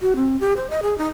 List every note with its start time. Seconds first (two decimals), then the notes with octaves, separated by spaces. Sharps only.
0.02 F#4
0.16 C4
0.41 G4
0.57 C5
0.70 D#5
0.82 G#4
0.98 D#4